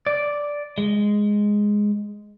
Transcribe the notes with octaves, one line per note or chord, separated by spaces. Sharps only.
D5
G#3